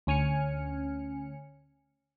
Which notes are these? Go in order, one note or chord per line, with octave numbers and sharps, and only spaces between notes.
D2 C#4 G#5 F6 C#7